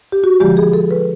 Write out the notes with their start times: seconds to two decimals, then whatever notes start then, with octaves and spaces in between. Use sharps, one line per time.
0.12 G4
0.24 F#4
0.40 D3 F3 G#3 G4
0.57 G#4
0.73 A4
0.91 B4